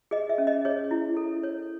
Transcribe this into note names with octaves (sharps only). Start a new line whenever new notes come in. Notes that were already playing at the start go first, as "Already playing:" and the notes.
G#4 D#5
E5
C#4
D#5
G#4 C#5
E4
A4
C#5